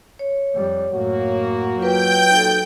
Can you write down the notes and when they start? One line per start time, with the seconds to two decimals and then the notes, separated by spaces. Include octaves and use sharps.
0.19 C#5
0.54 F2 G3
0.92 F#2 A2 A#3 F#4
1.79 F#3 F4 B4 G5 G6
2.31 D#2 A#2 D#4 F#4 A4